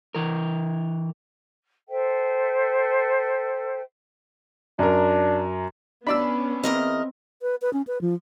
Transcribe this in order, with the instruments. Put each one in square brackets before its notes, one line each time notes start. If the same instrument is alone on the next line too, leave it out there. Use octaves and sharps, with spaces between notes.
[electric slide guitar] E3 A#4
[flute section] A4 C5 E5 G5
[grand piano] F#2 A#4 [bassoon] D4
[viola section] B3 C#4 [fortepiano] D4 D5 E6 [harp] B5
[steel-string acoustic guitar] E2 A#4 D#5 [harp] C4
[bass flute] B4
B4
C#4
B4
F3